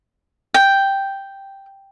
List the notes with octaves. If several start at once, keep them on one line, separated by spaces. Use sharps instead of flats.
G5